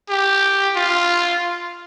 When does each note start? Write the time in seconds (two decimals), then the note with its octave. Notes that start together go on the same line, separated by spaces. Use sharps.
0.09 G4
0.75 F4